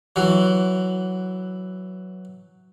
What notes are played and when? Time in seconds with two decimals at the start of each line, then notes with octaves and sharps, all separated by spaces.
0.16 E3 F#3